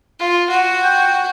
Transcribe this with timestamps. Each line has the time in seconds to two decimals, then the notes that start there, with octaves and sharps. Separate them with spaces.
0.19 F4
0.50 F#4
0.83 G5